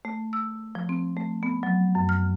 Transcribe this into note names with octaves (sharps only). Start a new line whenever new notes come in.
A3
E6
F3
C4
A3
B3
F#3
F#2
F6